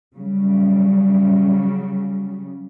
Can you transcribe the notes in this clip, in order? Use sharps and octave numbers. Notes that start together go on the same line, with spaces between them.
C#3 F#3 G3